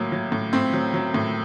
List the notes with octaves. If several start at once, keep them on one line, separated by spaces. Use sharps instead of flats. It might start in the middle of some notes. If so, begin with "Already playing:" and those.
Already playing: A2 F#3 A#3
F#3
A2
A2 C4
F#3
F#3
A2